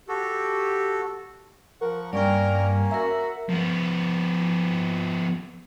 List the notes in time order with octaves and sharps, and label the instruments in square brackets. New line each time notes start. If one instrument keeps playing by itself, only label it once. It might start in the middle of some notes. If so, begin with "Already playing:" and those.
[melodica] F#4 A4 [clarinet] G4
[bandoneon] F3 F#5 C#6 [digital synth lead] A#4
[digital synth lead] G2 [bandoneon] A#3 C#4 [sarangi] A#4 [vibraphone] D5 G5
[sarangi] F#4 [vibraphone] A#4 A#5 [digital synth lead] E5
[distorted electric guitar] F3 B3